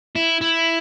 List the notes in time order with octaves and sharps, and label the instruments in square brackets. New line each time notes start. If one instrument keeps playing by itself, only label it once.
[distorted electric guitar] E4
E4